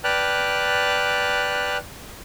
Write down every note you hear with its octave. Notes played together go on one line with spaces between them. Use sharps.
B4 D5 G5 A5 F6 F#6